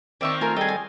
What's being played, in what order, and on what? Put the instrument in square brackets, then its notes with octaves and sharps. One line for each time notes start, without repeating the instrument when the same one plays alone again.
[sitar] D#3 A#3 C4 [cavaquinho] D5 E5 C#6
[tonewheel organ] A3 F4 [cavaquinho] A#4 G#5
[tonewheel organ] G3 A4 D#5 [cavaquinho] G#4 G5
[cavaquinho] G#5